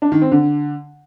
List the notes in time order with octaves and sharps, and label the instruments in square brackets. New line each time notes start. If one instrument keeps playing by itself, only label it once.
[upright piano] D4
D#3
C4
D3